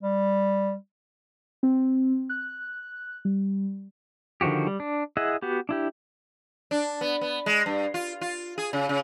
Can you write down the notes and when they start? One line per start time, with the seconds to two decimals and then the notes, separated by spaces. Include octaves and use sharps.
0.03 G3
1.63 C4
2.29 F#6
3.25 G3
4.41 D3 D#3 F3 F#4 G4
4.67 G3
4.80 D4
5.17 E4 G#4 D#5 E5 F#5
5.42 B3 F#4 G4
5.69 D4 E4 G4
6.71 D4
7.01 B3
7.21 B3
7.46 G#3
7.66 G2
7.94 F4
8.21 F4
8.58 G#4
8.73 C#3
8.89 C#3